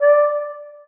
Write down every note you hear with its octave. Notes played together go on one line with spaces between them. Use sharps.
D5